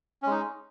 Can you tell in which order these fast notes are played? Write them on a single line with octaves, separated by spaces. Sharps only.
C#4 G#3 D#4